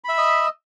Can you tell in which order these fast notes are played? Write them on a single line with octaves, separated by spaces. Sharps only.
B5 E5 E6 D#5